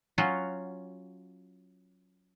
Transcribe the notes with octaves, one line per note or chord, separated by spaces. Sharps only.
F#3 C#4 F4 F#4